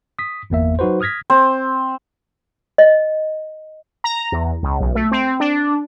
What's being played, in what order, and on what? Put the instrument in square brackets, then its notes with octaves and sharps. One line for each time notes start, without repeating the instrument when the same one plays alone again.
[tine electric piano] D#6 B6
G1 E2 A#3 E5
F#3 D#4 F#4 B4 C5
D#6 F6 G#6 A#6 B6
[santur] C4
[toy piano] D#5
[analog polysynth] A#5
E2
C#2
B1
A3
C4
D4